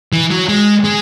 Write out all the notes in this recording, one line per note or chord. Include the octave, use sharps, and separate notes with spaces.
E3
F#3
G#3
G#3